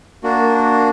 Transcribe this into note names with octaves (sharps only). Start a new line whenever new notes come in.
A#3 D4 F#4